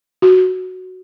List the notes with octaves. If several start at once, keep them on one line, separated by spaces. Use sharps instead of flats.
F#4